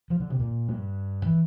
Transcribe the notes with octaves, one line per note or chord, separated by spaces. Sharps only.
F3
D3
C3
A#2
G2
E3